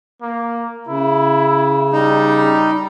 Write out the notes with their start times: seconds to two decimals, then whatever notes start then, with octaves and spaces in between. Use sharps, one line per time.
0.22 A#3
0.88 C#3 E4
1.92 G3 D#4